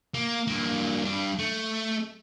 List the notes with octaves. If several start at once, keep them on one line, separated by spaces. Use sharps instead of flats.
A#3
G2 A#3
G2 D4
A3